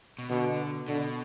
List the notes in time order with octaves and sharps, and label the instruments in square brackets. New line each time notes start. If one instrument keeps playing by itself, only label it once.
[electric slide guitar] B2
[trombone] B2 [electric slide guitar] D3
[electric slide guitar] B2 [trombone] D3